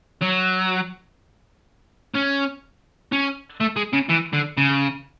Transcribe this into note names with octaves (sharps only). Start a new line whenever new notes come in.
F#3
C#4
C#4
A3
G#3
C#3
E3
D3
C#3